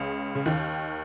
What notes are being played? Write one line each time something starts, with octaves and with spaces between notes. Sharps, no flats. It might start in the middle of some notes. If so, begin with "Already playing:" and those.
Already playing: C#2 C#3
C#3
D#2 D#3